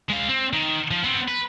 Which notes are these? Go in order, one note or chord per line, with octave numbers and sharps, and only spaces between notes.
G#3 F5
C4
D#3
F3
B3 C4
B4